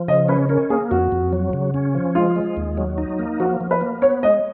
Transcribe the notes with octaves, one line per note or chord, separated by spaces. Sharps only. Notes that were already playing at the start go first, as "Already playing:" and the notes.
Already playing: F3
C#3 D#5
C#4 B4
C#4 A#4
A#3 G#4
F2 F#4
F2
F#3
C#3
C#4
F3
G#3 F4
G#3
D#2
F#3
D#4
A#3
F3 F#4
F3
B4
A#3
B3 C#5
G#3 D#5